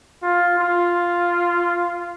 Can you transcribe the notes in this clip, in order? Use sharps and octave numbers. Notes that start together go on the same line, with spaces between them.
F4
F4